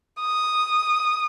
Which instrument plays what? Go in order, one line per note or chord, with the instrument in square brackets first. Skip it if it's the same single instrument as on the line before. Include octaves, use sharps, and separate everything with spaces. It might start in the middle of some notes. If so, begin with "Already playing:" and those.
[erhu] D#6